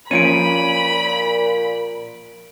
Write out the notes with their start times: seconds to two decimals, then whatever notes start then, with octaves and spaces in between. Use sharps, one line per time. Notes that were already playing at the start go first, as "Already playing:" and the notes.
0.11 A#2 F3 A#3 C#4 B5 D7 D#7